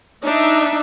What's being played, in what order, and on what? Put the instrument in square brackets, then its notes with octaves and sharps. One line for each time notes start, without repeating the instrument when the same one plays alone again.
[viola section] D4 D#4 E5